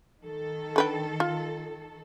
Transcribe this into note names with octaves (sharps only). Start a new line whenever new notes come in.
D#3 A4
D3 B4 G5
F4